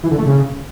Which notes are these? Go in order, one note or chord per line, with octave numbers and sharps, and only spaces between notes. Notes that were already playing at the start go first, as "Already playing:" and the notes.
E3
D3
A3
C#3